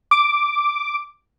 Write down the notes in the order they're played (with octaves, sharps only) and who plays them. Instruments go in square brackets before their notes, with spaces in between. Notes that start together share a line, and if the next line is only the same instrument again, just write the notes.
[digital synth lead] D6